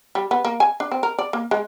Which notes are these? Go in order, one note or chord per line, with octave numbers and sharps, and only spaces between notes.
G3
B3
A#3
G#5
D4
C4
A#4
D5
A#3
G#3